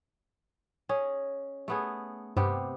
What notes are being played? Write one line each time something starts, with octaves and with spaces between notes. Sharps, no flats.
C#4 G#4 D#5
A3 B3 G#4
G2 C3 B3 G4